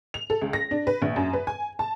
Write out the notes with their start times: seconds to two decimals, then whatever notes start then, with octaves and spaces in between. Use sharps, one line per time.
0.14 F7
0.30 A4
0.41 C#2
0.53 A#6
0.71 D4
0.87 B4
1.02 A#1
1.16 F#2
1.33 B4
1.47 G#5
1.79 A5